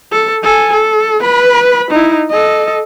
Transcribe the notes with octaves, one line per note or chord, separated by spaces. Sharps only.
A4
A4 G#5
A4
B4 B5
D#4 E4
A4 D#5